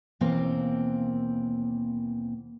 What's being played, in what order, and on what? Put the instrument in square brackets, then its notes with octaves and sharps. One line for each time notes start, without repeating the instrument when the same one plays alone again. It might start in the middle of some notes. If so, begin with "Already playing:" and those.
[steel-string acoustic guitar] D#2 B2 E3 A#3 C4